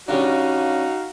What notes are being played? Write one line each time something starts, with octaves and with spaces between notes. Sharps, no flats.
C#3 G3 D4 D#4 F#4 F5